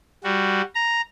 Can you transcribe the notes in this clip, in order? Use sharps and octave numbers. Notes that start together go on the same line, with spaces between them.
G3 F#4
A#5